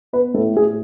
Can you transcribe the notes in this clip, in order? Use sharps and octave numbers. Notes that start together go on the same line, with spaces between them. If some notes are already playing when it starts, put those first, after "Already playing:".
B3 B4
A2 A4
A2 G#4